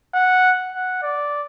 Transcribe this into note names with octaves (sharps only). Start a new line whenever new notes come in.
F#5
F#5
D5